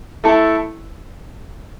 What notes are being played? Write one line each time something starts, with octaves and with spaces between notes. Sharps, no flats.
A3 E4 A4